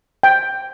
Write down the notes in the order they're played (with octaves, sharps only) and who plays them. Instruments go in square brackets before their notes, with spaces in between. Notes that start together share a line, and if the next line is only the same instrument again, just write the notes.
[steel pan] G5